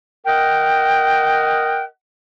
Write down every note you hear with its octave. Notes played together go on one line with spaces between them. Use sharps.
A#4 D#5 F#5 G5